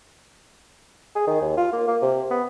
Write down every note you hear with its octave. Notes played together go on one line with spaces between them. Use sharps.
G#4
D#3
D#2
F4
A#3
A#3
C3
B3